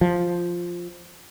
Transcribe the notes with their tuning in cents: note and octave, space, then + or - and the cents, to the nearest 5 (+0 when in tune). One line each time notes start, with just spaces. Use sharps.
F3 +0